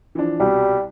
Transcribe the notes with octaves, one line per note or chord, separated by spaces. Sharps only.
E3 F3 D4
C2 B2 G3